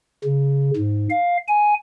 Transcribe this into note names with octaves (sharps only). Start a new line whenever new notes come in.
C#3
G#2
F5
G#5